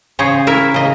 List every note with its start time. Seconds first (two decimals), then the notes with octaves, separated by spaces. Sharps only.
0.19 C#3 G#4 C5 C#5
0.47 E4 A#4 E5
0.74 C#3 D#5